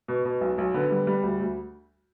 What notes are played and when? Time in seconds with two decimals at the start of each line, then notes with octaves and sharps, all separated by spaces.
0.08 B2
0.25 B2
0.41 B1
0.58 B1
0.74 D3 B3
0.91 G3
1.07 G3
1.23 D2
1.40 D2